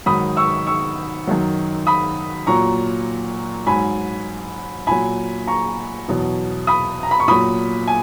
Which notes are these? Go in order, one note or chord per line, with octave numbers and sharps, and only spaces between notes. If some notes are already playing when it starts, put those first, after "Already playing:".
G#2 D#3 F#3 B5 D#6
C#6 E6
C#6 E6
F#2 D#3 F#3
B5 D#6
A#2 F#3 A#5 C#6
G#2 F#3 G#5 B5
A#2 F#3 G#5 B5
A#5 C#6
E2 B2 F#3
B5 D#6
A#5
B5
C#6
A#2 F#3 B5 D#6
G#5